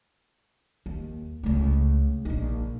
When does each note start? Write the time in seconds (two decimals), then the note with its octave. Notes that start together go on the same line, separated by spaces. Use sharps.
0.86 D#2
1.43 C#2 A3
2.25 A#1 D#4